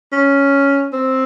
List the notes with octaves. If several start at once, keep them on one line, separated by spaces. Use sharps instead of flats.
C#4
C4